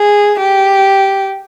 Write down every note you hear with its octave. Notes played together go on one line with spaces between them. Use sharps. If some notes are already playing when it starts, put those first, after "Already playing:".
Already playing: G#4
G4